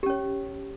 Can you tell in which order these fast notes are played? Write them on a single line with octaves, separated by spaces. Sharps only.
G4 C#4 C#5